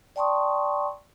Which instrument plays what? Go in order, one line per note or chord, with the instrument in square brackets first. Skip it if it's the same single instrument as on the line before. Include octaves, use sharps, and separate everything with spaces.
[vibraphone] D5 G5 A5 C6 C#6 D#6